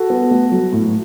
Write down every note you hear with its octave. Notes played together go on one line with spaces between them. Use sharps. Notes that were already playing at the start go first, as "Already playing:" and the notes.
Already playing: F#4 A4
B3
A3
F#3
A2